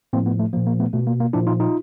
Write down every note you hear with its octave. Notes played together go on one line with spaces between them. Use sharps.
A2 F3 A#3 C4
A3 B3
A3
A#2 F3 A#3
A#3
A3 B3
B2 A3
A#3
A#3
A#2 F3 D4 E4
D#4 F4
D#4 F4